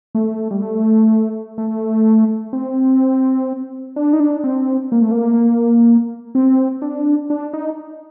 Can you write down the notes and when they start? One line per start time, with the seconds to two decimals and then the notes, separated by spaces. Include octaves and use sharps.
0.15 A3
0.51 G3
0.62 A3
1.58 A3
2.53 C4
3.96 D4
4.13 D#4
4.20 D4
4.44 C4
4.92 A#3
5.02 A3
5.11 A#3
6.35 C4
6.82 D4
7.30 D4
7.53 D#4